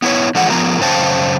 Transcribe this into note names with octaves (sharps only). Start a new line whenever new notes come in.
B3 E4 B4 C#5
D3 E3 F3 G#3 F#5
F3 B3 F4 A#4 A#5
F#2 C#3 C5 F5 G5 A5